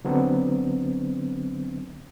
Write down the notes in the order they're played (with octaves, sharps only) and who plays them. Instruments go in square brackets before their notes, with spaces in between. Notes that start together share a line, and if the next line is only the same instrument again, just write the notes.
[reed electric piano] D3 F#3 B3 C4 D4